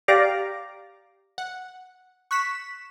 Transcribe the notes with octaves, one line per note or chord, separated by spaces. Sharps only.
G4 D5 F5 A#5 D6 A#6
F#5
C#6 F#6 B6 E7